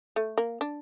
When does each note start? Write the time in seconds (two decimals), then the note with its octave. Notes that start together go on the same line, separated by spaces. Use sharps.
0.16 A3
0.38 A#3
0.61 D4